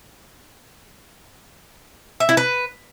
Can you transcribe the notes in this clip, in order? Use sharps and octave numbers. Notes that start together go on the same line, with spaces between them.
E5
E4
B4